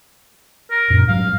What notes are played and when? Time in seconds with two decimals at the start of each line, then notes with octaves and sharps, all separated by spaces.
0.71 A#4
0.90 E1 F#2 A#2
1.08 G#2 F#3 G3 F5